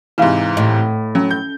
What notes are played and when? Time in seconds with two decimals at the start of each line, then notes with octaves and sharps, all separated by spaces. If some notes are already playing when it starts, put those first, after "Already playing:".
0.18 G#2 C3 E3 B4 F5
0.57 A2 D#5
1.15 F#3 C#4
1.31 G6